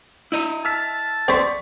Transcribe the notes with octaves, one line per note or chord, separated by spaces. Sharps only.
E4 D#5
A5 E6 F6 B6
C4 C5 D5 C#6 B6